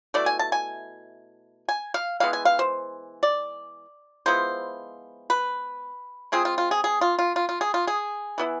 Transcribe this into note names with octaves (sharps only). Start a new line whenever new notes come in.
B2 A3 E4 D5
G#5
A5
G#5
G#5
F5
E3 G#3 B3 F5
G#5
F5
C5
D5
F3 G#3 B3 E4 C5
B4
G#3 C4 F4 G#4
F4
F4
G#4
G#4
F4
F4
F4
F4
G#4
F4
G#4
E3 B3 E4